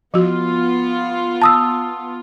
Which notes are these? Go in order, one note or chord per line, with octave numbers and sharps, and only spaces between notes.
F3 B3 F4 F#4
A5 D#6 E6